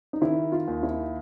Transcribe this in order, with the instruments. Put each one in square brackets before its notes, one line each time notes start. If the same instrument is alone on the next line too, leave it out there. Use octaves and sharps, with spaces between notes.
[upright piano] D#4
[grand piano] D#3 [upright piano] E4
[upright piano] F4
[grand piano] D#2
[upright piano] E4